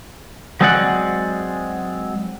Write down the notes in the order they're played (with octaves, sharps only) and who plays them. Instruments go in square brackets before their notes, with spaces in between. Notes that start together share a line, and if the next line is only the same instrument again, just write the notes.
[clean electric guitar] F#3 G#3 C4 G#4 D5 F#5